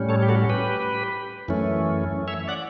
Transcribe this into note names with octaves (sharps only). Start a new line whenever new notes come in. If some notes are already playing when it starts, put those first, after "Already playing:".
Already playing: A2 G3 C#4
A4 C#5
G4
F#4 A4
G4 B4
F#2 E3 A3 C#4
C#5 E5
D5 F#5